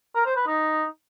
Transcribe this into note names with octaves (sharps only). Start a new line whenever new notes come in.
A#4
C5
B4
D#4